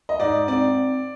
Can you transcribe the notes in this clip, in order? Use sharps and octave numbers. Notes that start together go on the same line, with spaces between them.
D#5
G#2 D5
C4 D5